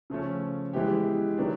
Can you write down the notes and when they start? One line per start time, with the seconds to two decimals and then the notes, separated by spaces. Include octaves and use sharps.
0.10 C#3 F3 A3 C#4
0.73 E3 G#3 B3 E4 G4
1.38 D#3 F#3 B3 D4